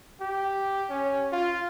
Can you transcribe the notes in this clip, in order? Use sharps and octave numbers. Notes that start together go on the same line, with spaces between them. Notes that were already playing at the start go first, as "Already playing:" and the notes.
G4
C#4
F4